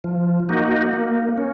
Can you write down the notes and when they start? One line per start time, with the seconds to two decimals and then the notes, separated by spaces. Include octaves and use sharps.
0.04 F3
0.49 A#3 D#4 F#4
0.93 A#3
1.38 C#4